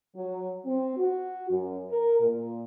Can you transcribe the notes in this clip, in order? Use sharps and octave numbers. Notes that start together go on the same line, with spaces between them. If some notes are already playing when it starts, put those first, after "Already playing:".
F#3
C4
F#4
F#2
A#4
A#2